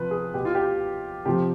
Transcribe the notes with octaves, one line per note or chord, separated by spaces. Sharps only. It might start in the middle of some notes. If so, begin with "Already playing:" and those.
Already playing: C3 F3 B4
G#4
B2 G4
F4
G4
C3 F3 G4